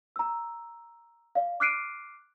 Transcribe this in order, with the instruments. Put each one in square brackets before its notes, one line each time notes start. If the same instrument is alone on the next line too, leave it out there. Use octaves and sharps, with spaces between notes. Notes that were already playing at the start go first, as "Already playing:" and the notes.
[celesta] A#5 E6
D5 F5
D6 F6 F#6 C7 D7 D#7